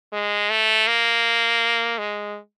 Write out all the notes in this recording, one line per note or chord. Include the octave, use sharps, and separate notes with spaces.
G#3
A3
A#3
G#3